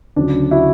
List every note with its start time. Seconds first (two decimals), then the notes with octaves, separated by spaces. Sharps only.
0.16 D2 C#3 F#3 D4
0.51 E4 F#4